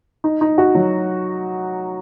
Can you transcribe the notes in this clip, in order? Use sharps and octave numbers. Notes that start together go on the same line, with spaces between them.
D#4
D#4
F#4
F#3